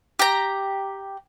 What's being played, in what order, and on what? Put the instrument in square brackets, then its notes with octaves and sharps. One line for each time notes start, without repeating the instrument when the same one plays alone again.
[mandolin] G4 A#5